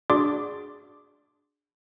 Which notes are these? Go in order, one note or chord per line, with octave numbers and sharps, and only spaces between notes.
D4 F#4 G#4 D5 C6 D6